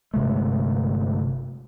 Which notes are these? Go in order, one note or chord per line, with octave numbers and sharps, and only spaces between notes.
G1 C3 G#3 A3